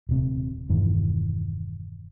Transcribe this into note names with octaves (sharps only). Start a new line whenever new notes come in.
D#1 C3
E1 G2 D#3 E3